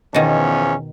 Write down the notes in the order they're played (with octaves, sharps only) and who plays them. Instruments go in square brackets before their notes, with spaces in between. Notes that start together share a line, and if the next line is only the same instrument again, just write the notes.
[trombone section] E2 F3 C#4 [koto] B2 D#3